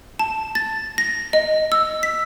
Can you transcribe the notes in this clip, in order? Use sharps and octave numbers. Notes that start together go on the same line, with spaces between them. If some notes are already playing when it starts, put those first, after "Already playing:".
A5
A6
A#6
D#5
E6
B6